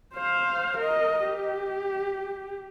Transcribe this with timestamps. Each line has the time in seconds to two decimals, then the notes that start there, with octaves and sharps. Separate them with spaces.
0.15 C5 F5
0.78 A#4 D#5
1.25 G4